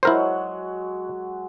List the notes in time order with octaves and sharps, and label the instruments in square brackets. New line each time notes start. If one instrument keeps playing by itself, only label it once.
[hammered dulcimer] F#3 G#3 F#4 [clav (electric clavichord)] E4 A#4 C5